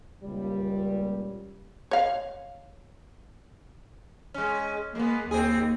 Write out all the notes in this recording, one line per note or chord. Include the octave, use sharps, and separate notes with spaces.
C#2 A#2 G3
C#5 F5
G#3 C#4
G#3 A#3 B3
D#2 C4 G#4